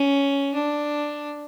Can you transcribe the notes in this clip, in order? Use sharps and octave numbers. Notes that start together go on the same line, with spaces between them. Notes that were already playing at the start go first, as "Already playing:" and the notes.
Already playing: C#4
D4